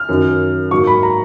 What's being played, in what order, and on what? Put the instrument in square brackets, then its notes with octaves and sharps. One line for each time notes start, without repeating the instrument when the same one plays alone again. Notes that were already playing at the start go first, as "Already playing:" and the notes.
Already playing: [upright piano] F6
F#2 D#3 F#3
G#2 F#3 A#3 C#6
B5
A#5